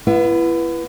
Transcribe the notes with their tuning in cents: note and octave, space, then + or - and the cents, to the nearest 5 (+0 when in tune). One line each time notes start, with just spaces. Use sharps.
B3 -15 E4 +35